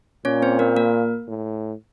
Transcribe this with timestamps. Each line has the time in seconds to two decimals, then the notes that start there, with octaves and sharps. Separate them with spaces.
0.25 A#2 C#4 C#5
0.42 C4 C5
0.59 A#3 A#4
0.76 A#3 A#4
1.28 A2